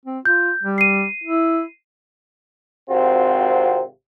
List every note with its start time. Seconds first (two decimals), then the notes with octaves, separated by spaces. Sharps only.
0.05 C4
0.25 F4 G6
0.63 G3
0.78 C7 D#7
1.24 E4
2.90 G#1 C3 C4 F4 F#4